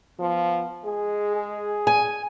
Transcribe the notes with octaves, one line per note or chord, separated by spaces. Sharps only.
F3 B3
G#3 G#4
G#4
G#5